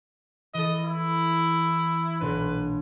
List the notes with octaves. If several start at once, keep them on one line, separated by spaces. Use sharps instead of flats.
E3 A4 D#5
E4
B1 A#2 D4 B4